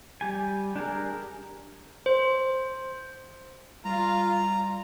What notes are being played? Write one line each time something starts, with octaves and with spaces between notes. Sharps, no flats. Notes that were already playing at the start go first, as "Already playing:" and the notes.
G3 G4 G#5
D4 G4 G#4 A#4
C5
G3 F4 A#5